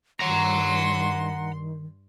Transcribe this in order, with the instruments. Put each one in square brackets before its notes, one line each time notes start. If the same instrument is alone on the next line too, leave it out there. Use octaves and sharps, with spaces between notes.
[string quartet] G2 C6 [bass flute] D#3 [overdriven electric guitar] F#5 A#5